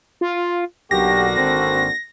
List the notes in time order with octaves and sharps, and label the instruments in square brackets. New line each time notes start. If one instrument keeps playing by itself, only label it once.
[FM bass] F4
[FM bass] B1 [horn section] D3 A#3 F#4 [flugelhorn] G4 [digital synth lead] A#6
[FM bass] G#1 [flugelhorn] C4